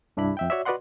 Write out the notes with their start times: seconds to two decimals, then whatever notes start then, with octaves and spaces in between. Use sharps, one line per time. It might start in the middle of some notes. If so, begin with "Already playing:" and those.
0.17 C2 G2 D4 E4 B5
0.37 F2 E5 G5
0.50 F#4 C#5 D5 E5
0.65 F#4 B4 D5 D#5 F#5 C6